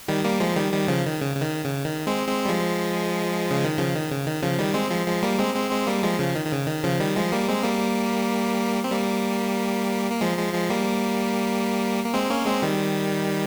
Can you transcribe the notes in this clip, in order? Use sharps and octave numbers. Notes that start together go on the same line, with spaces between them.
D#3 G3
G3 A#3
F3 G#3
D#3 G3
D#3 G3
C#3 F3
D#3
C#3
C#3
D#3
C#3
D#3
G#3 C4
G#3 C4
G3
F3 G#3
C#3
D#3
C#3 F3
D#3
C#3
D#3
C#3 F3
D#3 G3
G#3 C4
F3 G#3
F3 G#3
G3 A#3
G#3 C4
G#3 C4
G#3 C4
G3 A#3
F3 G#3
C#3 F3
D#3
D#3
C#3
D#3
C#3 F3
D#3 G3
F3 G#3
G3 A#3
G#3 C4
G3 A#3
C4
G3 A#3
A#3
F3 G#3
F3 G#3
F3 G#3
G3 A#3
A#3
G#3 C4
A#3 C#4
G#3 C4
D#3 G3